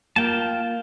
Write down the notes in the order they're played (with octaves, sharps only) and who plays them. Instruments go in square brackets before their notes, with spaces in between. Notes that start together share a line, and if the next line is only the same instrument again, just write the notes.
[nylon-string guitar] A#3 [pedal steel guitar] F4 G5 A5